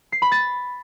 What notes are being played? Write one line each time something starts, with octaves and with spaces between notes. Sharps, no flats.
C7
B5
A6